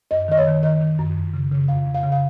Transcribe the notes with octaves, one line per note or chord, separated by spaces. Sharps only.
F#2 D#5
D#3 D#5
C#5
D#3
D#3 D#5
D#3
F#2
F2
C#3
C#3
F2 F5
F2
F5
C#3
F5